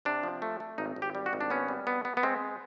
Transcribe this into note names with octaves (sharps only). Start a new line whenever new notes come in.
C3 D4
F3
A3
A3
G#1 D#4
G#1
G4
G3
F#4
G#1
D4
B3 C#4
G3
B3
B3
B3
G#3 C4